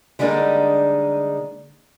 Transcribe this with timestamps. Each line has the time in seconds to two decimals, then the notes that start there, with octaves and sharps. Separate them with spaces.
0.19 D3 G3 G#3 A#3 D4 D#4